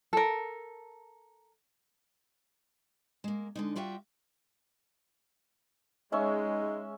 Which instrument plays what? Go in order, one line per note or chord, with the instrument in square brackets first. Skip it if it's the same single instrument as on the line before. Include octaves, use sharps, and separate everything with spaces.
[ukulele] A4 A#4
[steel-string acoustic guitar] G#3 A#3
D3 G#3 D#4
G3 F4 F#4 E5 G5
[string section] G#3 [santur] C#4 E5 C#6 [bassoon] D#4